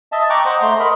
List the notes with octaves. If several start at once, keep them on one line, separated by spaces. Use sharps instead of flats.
D#5 E5 A5
G5 A#5 C#6 D6 F#6
C5 D#5 F#5
A3 A#5 C6
A#4 D#5 A#5 B5